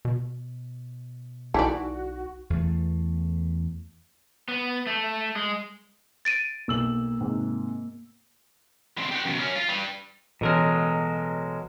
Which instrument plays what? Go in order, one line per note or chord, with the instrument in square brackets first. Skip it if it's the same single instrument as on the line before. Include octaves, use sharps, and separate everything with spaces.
[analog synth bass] B2
[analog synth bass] B1 [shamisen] E3 A3 D5 [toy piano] D#4 F5 [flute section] F#4
[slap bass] E2 A3
[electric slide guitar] B3
A3
G#3
[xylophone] A6 D7 D#7
[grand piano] B1 F#7 [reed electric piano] A#3 E6
[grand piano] G#2 C3
[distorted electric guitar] D3 C4
G4 F#5
F#2 B2
C#4 A#4
F4
G3 B4
[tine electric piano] A1 A4 F6 [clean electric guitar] B2 F#3 G#3